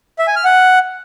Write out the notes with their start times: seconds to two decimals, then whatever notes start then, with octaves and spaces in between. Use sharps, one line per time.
0.19 E5
0.27 G#5
0.36 F6
0.45 F#5